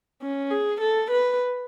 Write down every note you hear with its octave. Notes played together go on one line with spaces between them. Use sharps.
C#4
G#4
A4
B4